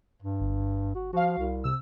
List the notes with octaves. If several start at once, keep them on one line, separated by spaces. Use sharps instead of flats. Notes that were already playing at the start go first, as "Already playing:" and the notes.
G2
G1
F#4
F3 F#4 F5
C2
C3 E6